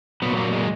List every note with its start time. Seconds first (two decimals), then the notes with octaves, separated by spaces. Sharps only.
0.22 A#2 F#3 B3
0.37 A#3
0.53 G#3